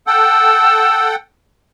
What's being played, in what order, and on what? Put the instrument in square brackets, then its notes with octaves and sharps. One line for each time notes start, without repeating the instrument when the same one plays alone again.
[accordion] A4 F#5 G5 [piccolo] E6